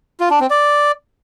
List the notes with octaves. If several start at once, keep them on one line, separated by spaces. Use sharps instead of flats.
F4
D4
C4
D5